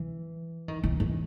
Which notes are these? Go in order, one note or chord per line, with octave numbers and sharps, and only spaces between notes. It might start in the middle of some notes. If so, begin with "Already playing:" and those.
Already playing: E3
D#3
E3
E3